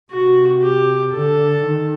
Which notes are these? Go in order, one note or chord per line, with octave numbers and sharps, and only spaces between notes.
C3 F#4
G4
D3 A4
D#3